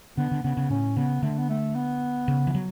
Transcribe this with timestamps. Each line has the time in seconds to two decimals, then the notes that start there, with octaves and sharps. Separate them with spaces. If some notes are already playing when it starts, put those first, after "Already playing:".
0.17 D3 B3
0.31 D3
0.44 C#3 B3
0.57 C#3
0.70 A2 C#4
0.97 C#3 B3
1.22 D3 A3
1.38 B3
1.49 A3
1.75 B3
2.28 C#3
2.47 E3
2.55 F#3